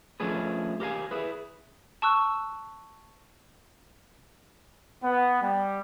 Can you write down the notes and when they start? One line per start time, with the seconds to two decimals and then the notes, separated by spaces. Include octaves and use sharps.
0.20 F3 A3 C#4 D4 G#4 B4
0.80 G4 A#4 B4 F5 G#5
1.11 E4 G#4 B4
2.02 A5 C#6 E6 F#6
5.03 B3
5.42 G3